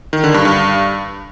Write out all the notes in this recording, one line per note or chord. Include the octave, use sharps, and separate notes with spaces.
D#3
D3
G2
G2